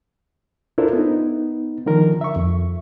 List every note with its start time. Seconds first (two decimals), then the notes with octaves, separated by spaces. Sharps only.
0.78 D4 E4 F4 A4 A#4 C5
0.93 B3 D#4
1.86 D3 D#3 F3 A#4
2.21 E5 C#6
2.36 F2